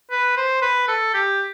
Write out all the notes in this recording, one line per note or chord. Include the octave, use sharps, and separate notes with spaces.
B4
C5
B4
A4
G4